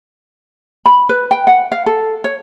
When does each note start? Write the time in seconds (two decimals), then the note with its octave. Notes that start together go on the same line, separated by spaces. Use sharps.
0.86 B5
1.09 B4
1.31 G5
1.47 F#5
1.72 F5
1.86 A4
2.24 C#5